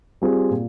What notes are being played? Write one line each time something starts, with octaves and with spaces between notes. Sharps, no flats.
G3 C4 F4 G#4
A#2